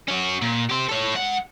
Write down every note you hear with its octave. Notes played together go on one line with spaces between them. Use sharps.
C#4 F#4
A#2
G4 C5
A4 C#5
G#2 F#5